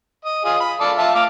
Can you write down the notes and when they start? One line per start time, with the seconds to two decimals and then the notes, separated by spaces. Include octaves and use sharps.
0.25 D#5
0.45 F4 G#4 D#5
0.60 B5
0.80 F4 A4 D5
0.98 F4 E5 A5
1.15 F5 D6 F6